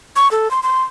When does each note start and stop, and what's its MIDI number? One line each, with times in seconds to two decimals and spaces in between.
0.16 0.31 85
0.31 0.51 69
0.51 0.60 84
0.63 0.83 84